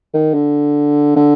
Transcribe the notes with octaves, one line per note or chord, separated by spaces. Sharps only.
D#3
D3
D3